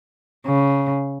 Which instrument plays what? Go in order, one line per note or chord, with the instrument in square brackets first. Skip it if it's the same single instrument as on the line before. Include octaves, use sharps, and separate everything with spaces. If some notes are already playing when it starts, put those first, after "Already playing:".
[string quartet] C#3